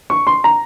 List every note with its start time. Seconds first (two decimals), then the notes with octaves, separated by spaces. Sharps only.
0.10 C#6
0.27 C6
0.44 A#5